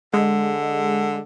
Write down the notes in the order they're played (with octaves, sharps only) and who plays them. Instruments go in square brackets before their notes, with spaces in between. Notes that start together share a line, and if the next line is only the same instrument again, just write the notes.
[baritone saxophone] D3 [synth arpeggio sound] G#3